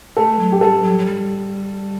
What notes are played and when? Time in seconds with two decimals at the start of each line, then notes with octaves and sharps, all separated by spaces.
0.17 A3 A4
0.39 F#3
0.52 G4
0.61 G3 A4
0.83 F#3
0.99 F#3
1.06 G3